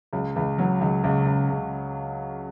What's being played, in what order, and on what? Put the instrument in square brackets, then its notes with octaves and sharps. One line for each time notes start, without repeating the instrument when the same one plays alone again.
[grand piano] C#2 [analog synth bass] F#3
[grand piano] C#2 [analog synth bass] E3
[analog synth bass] E3 [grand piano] F#3
[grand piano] C#2 [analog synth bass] D#3
[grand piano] C#2 [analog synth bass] C#3
[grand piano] C#2
C#2